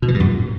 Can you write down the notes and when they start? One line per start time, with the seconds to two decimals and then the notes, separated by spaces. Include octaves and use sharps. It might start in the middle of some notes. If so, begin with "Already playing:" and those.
0.02 B2
0.08 E3
0.14 G2
0.20 F#2
0.26 A#2